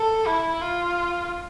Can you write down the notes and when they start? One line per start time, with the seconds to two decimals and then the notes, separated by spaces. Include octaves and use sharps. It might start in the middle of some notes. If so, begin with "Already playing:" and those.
Already playing: A4
0.27 E4
0.61 F4